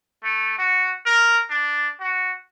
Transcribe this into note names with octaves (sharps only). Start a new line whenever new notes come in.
A3
F#4
A#4
D4
F#4